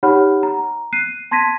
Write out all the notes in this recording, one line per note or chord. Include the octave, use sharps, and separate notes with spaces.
D#4 G4 C#5 F#5 B5 F6
A#5
F#6 C7 D#7
A5 C6 G#6 A#6 B6 D#7